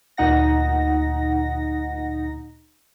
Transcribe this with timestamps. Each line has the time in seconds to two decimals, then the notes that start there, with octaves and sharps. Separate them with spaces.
0.17 D2 A#2 D#4 F#5 A#6